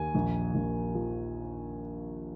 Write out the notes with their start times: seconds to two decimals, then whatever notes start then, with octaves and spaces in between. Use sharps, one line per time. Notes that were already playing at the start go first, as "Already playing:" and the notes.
Already playing: D#2 G#5
0.15 A#1
0.55 A#1
0.95 F3